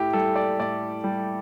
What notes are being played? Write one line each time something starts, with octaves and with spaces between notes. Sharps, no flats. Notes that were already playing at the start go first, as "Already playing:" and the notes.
Already playing: A2 E4 G4
G3 A4
D5
A2 D5
G3